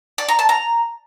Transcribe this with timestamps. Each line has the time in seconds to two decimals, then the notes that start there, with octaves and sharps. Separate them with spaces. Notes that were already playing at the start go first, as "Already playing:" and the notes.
0.18 D5
0.28 A#5
0.39 A5
0.49 A#5